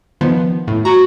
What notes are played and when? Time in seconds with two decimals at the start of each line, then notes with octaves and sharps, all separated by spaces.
0.21 D#3 F3 B3
0.67 A2
0.85 F#4 A#5